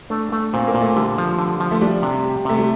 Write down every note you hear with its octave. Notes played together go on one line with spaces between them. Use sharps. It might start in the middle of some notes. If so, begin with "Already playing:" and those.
A3 D4
A3
A#2 C4
A#3
A#2
A3
D3 G3
F3
D3
F3
A3
G3 D4
C3
G4
C3 A3
G3